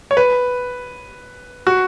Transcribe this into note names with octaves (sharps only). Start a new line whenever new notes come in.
C#5
B4
F#4